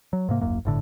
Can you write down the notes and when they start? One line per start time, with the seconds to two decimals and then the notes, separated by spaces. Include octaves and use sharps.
0.13 F#3
0.29 G#2 C3 A#3
0.41 D#1 G#1 F#2 A#3
0.65 G1 A2 D3